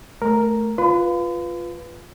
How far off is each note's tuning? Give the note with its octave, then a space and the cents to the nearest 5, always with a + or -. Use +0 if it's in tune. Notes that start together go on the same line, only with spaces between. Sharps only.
A3 -10 A#4 +0
F4 +0 B4 +0 B5 +45